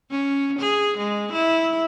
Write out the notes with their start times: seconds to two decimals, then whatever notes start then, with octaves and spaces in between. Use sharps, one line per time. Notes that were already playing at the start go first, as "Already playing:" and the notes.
0.11 C#4
0.59 G#4
0.98 G#3
1.33 E4